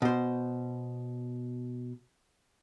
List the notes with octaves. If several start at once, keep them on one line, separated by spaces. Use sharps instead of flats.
B2 C5